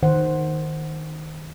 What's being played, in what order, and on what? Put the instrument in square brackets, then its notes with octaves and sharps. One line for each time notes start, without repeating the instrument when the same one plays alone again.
[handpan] D#3 C5 F#5